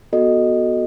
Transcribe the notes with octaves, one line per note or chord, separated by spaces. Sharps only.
B3 F#4 A4 D#5